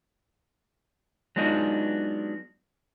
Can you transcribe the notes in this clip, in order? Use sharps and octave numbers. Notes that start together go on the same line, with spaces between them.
F#3 G#3 B3 D4 D#4 F4